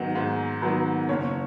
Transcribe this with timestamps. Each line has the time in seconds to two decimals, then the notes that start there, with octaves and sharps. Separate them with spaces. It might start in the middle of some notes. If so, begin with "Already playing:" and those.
Already playing: G#2 D#3 F#3 B3
0.15 G#2
0.62 D#3 F#3 B3
1.09 F#1 C#5